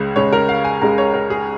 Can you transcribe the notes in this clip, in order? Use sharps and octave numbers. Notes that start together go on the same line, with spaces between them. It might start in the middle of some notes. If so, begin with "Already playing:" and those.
Already playing: C#2 C#3 G#3
C#2 C#3 G#3 C#5
A#4
F5
G#5
C#2 C#3 G#3 A#5
C#5
A#4
G#4